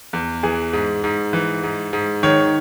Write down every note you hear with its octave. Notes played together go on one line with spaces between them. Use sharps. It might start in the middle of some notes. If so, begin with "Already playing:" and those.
E2
E3 G#4
G#2
G#2
E3
G#2
G#2
D#3 C#5